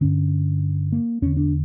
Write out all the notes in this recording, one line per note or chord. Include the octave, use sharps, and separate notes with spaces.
G2 D3 C#4
A#3
E2 D3 C#4
D4